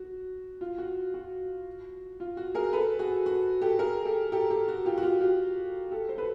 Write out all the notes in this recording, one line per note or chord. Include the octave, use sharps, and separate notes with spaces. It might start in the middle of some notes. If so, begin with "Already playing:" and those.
Already playing: F#4
F4
F#4
F#4
F4
F#4
G#4 A#4
A4 B4
F#4 G#4
F#4
G4 A4
G#4 A#4
G4 A4
G4 A4
G4 A4
F#4
F4 G4
F#4
F4 G4
F4 G4
G4 A4
C5
A4 B4